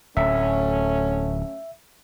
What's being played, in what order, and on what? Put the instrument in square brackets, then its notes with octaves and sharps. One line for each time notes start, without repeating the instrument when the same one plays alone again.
[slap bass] D1 [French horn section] F#3 A3 C#4 [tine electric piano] E5